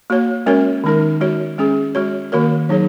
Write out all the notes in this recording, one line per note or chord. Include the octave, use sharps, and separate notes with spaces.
A#3 F#4 C#5
G#3 C#4 F#4 A#4 C#5
D#3 G#3 D#4 A#4
G#3 F#4 C#5
G#3 C#4 G#4
G#3 F#4 C#5
D#3 A#3 F#4 A#4 C#5
F#3 D#4 G#4 C#5